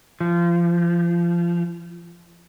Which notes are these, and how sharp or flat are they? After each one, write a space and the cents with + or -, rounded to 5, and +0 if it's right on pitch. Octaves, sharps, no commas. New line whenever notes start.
F3 -25